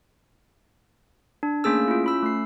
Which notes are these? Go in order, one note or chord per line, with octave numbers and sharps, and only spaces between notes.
D4
A3 A#3 C#4 G#4 E6
E4 F4
C#4 B5 E6
A3 C7